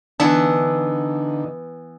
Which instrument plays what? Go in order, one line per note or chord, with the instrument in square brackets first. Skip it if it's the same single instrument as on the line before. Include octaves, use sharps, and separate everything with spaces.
[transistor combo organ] D3 D#4 [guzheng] E3 B3 E5 [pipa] D4